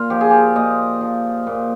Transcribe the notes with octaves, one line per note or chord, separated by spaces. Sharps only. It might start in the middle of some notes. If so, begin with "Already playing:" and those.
Already playing: A#2 F4
F3 G4
G#4
G4
A#2 D#5
F3
A#2